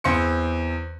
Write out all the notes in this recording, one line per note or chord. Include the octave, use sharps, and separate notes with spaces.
E2 C4 C6 C#7